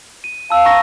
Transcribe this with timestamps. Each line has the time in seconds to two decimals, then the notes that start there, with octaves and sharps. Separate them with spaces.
0.24 D#7
0.50 F5 A5 E6
0.65 A#5 C#6 A#6